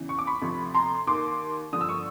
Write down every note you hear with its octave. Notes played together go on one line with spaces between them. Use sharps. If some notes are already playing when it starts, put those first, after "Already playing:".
Already playing: E2 C#3 E3
C#6
D6
B5 C#6
D2 C3 F3
A#5 C6
D#2 D#3 C6 D6
G2 D3 F3 D#6
E6
C#6 D#6